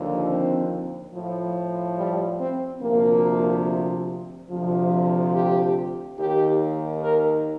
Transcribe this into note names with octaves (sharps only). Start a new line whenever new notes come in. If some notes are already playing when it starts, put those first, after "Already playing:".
Already playing: D#2 D3 F3
C4
A2 F3
G3
C4
D2 C3 F3 A#3
D2 C3 F3
G4
D#2 D#3 G4
A#4